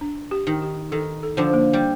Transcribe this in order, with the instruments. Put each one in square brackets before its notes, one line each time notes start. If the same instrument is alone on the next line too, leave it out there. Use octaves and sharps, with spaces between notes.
[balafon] D4
G4
[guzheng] D#3
[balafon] G4
[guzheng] D#3 [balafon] A4
[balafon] A4
[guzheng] D3 F3
[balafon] A#3
[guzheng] G3